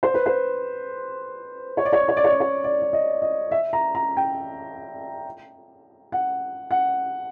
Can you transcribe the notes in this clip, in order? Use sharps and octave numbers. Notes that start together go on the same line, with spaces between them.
C5
B4
C5
C#5
D5
C#5
D5
C#5
D5
C#5
D5
C#5
D5
D5
D#5
D#5
E5
A#5
A#5
G5
F#5
F#5